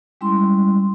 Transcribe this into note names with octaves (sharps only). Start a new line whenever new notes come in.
G3 G#3 C#4 E4 C6